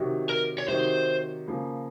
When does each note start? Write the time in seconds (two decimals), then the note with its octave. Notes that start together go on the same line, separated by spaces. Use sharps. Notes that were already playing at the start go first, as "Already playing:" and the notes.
Already playing: C3 D#3 F#3
0.29 A#4
0.58 C#5
0.68 C3 D#3 F#3 C5
1.48 C#3 F3 A#3